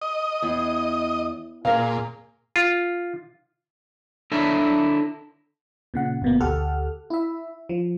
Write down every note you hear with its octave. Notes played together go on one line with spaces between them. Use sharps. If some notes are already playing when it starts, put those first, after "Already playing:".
D#5
E2
A#2 G#4 A#4 F5
F4
D4 E4 A4 A#4 C#5 E5
A#2 C#3 F#5
G1 B2 A#3
D2 G4 A4 F#5 F6
E4 E5
F3